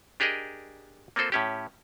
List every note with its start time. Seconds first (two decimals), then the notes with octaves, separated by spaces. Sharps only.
0.20 D4 G4 G#4 A#4 D#5
1.16 A#3 C4 F4 A4 C5
1.32 A2 C#4 G4